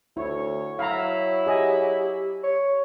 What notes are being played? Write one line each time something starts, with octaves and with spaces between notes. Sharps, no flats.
D2 E4 C#5
F#3 E4 F5 A#5
G4 G#4 D#5 G#5
C#5